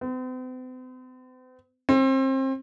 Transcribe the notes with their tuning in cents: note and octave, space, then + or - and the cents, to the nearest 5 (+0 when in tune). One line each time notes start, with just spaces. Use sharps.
C4 -45
C4 +30